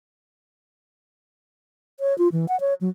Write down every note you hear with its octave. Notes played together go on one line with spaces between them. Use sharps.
C#5
F4
E3
F#5
C#5
F#3